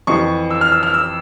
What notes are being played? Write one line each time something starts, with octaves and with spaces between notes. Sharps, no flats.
F2 E3 C#6
E6
F6
E6
F6
E6